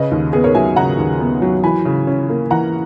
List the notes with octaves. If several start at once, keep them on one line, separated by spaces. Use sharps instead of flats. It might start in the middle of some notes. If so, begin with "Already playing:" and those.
Already playing: C#3 B4 D#5
D#2
B3 G#4 B4
A#4 C#5
F#3 E5 G#5
C#3 F#5 A#5
D#2
B3
F#3
E3 G#5 B5
C#3
C#4
A#3
E3 F#5 A#5